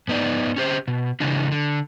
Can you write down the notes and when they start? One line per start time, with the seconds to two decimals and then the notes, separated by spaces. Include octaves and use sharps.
0.08 G#2 B3 D#4 D5
0.56 C#4 G4 C5
0.88 B2
1.20 C#3 E3 G#3 D4
1.52 D3